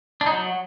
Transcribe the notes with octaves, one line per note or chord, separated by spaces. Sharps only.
D4
D#4
F#3